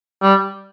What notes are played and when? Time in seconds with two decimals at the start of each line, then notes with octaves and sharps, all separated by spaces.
0.22 G3